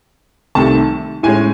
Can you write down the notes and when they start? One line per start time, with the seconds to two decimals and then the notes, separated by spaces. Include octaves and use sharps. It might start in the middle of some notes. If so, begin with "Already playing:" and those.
0.55 C2 C3 D#3 A3 A5
1.23 A2 G#3 C#4 G#5